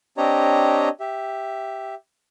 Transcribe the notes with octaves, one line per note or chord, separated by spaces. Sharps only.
C4 D4 G4 C#5 D#5 A#5
G4 E5